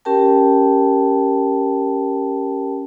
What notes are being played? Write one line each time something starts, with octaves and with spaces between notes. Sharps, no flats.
C#4 G4 A#4 G5 A5